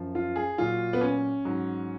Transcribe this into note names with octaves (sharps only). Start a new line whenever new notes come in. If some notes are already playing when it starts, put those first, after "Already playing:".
Already playing: F#2 F3
F4
G#4
A#2 F#3 F4
B3
C#4
G#2 F#3